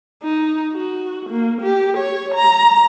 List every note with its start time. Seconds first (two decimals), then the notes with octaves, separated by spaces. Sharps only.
0.23 D#4
0.73 F#4
1.30 A#3
1.62 G4
1.97 C#5
2.34 A#5